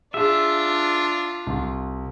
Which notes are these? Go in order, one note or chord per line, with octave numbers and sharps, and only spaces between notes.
D4 F4 G#4 E5
C2